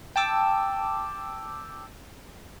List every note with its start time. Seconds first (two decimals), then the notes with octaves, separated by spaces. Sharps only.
0.16 G5 A5 D6 E6